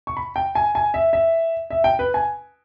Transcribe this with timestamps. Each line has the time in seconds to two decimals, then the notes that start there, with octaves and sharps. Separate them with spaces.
0.07 C#6
0.17 B5
0.36 G5
0.55 G#5
0.75 G#5
0.94 E5
1.13 E5
1.70 E5
1.84 G5
1.99 B4
2.14 G#5